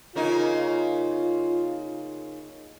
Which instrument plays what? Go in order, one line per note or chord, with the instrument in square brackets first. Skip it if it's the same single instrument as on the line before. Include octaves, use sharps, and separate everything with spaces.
[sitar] C#3 A#3 D#4 [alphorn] F4